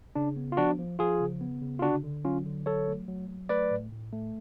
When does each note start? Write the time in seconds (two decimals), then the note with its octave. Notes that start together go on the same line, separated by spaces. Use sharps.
0.15 C#3 D4
0.36 B3
0.52 F4
0.57 F3 D4 F#4
0.78 F3
0.99 F3 F4 G#4
1.21 C#3
1.41 B3
1.62 C#3
1.79 F4
1.82 D3 D4 F#4
2.04 D3
2.25 F#3 C#4 F4
2.46 D3
2.66 F#3 A4 C#5
2.88 A3
3.08 F#3
3.29 F#3
3.49 A3 B4 D5
3.71 A2
3.92 A2
4.12 A3